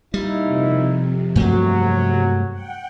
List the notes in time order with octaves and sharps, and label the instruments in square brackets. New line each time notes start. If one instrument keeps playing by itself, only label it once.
[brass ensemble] A#2 D#4 E4 [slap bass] G3
[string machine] F2 C3
[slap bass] G2 A3 A#3 [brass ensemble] F#3
[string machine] F#5 G5